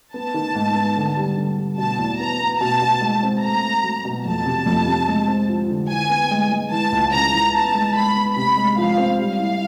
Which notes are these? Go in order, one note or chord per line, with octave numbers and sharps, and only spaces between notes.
B3 A5
D#3
G#2
B3
D3
G3
D3
G3
B2 A5
E2
B3 A#5
B3
B2 A5
B2
G#3
C4
A3 A#5
A3
F#3
B2
F2 A5
C3
F2
C3
G#3
C4
F3
D3
E3 G#5
B3
G#3
G#3
E3 A5
C#2
C#3 A#5
E3
B3 A5
G#3
G#3 B5
B3
C3 B5
G#3
F3 F5
C4
G3 F5
E4